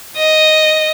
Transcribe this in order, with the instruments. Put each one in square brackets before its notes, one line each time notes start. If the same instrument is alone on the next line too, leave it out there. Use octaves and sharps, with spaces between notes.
[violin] D#5